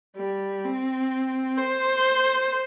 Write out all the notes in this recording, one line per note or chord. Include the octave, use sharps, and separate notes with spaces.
G3
C4
C5